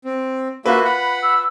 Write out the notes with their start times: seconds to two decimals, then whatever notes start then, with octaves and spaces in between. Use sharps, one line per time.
0.05 C4
0.66 A#3 F4 F#4 B4 E5
0.85 F#5 B5
1.23 E6